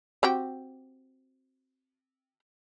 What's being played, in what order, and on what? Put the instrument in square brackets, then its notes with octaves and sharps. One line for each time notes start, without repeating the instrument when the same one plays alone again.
[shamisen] C4 F#4 G4